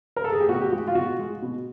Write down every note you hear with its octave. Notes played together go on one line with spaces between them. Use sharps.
A#4
A4
G#4
G4
B2 F#4
G4
G#3 F#4
F4
B2 F#4
G#3
B2